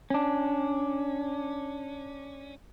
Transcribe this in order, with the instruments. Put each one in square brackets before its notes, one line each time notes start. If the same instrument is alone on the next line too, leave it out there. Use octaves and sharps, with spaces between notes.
[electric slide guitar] C#4 D4